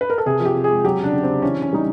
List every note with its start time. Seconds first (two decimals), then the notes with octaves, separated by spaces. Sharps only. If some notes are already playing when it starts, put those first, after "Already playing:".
0.01 B4
0.10 A#4
0.18 A4
0.26 C3 G#4
0.40 F3
0.45 G4
0.56 C3
0.64 G#4
0.70 G#3
0.84 F#3 G4
1.00 C#3 D4
1.13 C#3
1.24 C#3 C4
1.42 E3 C#4
1.58 C#3 C#4
1.73 G3 D#4